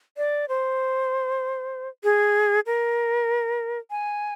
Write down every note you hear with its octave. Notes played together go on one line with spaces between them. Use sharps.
D5
C5
G#4
A#4
G#5